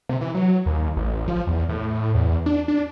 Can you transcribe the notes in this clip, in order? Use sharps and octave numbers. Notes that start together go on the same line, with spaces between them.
C3
E3
F#3
D#2
A1
F3
E2
A2
E2
D4
D4